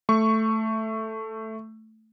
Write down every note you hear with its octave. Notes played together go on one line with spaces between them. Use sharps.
A3 C#6